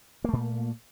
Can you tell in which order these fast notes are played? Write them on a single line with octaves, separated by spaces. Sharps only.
A#3 A3 A#2